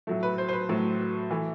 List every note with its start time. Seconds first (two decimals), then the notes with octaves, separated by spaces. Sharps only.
0.07 A2 F#3 A3
0.23 B4
0.38 C5
0.48 C5
0.53 B4
0.69 A2 F#3 A3
1.31 E3 A3